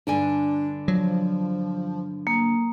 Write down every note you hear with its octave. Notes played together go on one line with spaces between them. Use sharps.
G2 D3 D4 G#5
F3 F#3
A#3